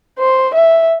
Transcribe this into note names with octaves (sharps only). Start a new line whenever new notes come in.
C5
E5